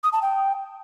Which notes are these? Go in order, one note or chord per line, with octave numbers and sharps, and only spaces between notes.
D#6
A5
G5